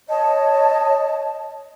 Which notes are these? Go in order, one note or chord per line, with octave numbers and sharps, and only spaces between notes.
C#5 D#5 A5